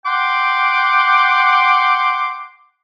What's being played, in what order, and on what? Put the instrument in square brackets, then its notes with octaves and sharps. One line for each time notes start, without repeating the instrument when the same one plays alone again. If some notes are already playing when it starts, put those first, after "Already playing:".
[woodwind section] F#5 G5 C6 D6